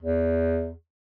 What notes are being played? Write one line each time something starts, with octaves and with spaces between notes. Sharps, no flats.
E2